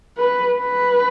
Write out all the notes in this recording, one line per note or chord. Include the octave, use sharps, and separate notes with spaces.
B4
B4